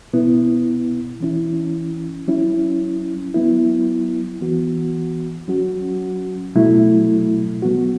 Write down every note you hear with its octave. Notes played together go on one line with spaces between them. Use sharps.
B2 B3 E4
E3 C#4 E4
F#3 C#4 E4
F#3 B3 E4
E3 B3 F#4
F#3 C#4 F#4
B2 F#3 A3 E4
F#3 B3 F#4